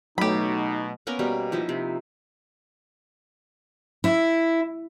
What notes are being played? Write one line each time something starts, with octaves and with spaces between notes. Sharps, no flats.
B2 F#3 A3 D#4 G4 B5
A#3 B3 C#4 A#4
B2 G3 A#3
F3 D#4 E4
C3
E4